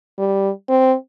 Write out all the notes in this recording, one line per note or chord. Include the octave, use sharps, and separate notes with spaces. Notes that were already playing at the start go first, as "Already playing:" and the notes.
G3
C4